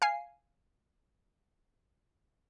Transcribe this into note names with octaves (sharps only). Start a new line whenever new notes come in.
F5 G#5 C7